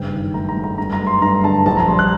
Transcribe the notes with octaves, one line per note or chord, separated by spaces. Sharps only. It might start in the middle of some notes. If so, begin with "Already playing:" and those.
Already playing: F#1 G2 G5
D#3
A3 A#5
A#5
F#2
A#5
G2 A#5
A#5
A3
C6
G2 A#5
D3 A5
A#1 A5
A#5
G3 C6
F#6